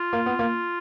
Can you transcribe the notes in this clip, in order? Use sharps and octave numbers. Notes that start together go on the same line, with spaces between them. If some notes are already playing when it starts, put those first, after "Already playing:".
Already playing: F4
A#3
B3
A#3